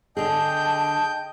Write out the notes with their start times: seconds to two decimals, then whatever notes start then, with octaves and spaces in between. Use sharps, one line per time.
0.17 D3 G#4 D#5 G5 A5 G6